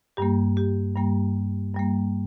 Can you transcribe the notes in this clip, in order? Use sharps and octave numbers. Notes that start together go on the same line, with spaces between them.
G2 G3 A#3 G4
G4
G2 G3 A#3
G2 G3 A#3